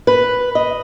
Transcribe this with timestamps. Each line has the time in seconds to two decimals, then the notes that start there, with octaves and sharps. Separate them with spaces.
0.07 B4
0.55 D#5